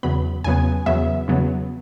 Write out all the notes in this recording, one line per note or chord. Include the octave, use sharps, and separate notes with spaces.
E2 C#3 F#3 B3 B5
E2 C#3 F#3 B3 G#5
E2 C#3 F#3 B3 E5
E2 C#3 F#3 B3